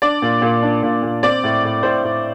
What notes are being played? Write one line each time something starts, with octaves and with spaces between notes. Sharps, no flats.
D4 D5
A#2
A#2
D4
A#2
A#2
C4 D5
A2
A2
A2 C5
A2